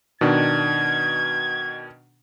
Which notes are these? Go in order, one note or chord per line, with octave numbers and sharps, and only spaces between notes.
B2 D#3 D4 G#6